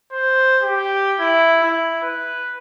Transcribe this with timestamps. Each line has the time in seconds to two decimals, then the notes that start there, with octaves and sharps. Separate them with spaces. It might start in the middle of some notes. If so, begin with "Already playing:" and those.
0.12 C5
0.62 G4
1.20 E4
1.63 E4
2.03 B4